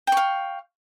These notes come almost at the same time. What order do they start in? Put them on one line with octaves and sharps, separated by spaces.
G5 C#6 F5